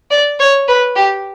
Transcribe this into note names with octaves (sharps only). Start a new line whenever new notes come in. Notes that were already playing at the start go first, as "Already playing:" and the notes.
D5
C#5
B4
G4